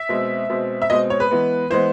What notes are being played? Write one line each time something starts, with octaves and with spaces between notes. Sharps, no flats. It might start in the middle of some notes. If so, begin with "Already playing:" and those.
Already playing: E5
B2 G#3 C4
B2 G#3 C4
E5
B2 G#3 C4 D#5
C#5
B4
E3 G#3 B3
E3 G#3 B3 C5